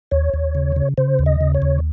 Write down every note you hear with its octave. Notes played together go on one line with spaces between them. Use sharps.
D#2 C#5
D#2
C#3
C#3
C#3 C5
D#2
D#5
C#3
C#5
D#2